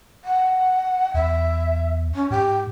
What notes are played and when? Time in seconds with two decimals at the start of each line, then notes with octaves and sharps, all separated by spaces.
0.25 F#5
1.14 E2 E5
2.15 C#4
2.30 G#2 G4